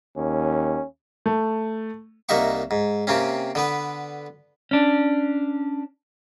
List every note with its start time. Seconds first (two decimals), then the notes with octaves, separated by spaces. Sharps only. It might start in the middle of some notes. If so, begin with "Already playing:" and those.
0.17 D#2 C#4
1.26 A3
2.29 C2 A#3 D#4 E5 F#5 C#6
2.71 G#2
3.07 C3 A#3 C4 C#4
3.55 D3 B3 B4
4.71 C#4 D4